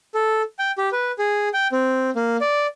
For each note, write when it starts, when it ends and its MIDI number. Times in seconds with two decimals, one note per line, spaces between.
0.15 0.42 69
0.59 0.71 79
0.78 0.89 67
0.92 1.12 71
1.19 1.48 68
1.53 1.68 79
1.72 2.10 60
2.16 2.37 58
2.41 2.67 74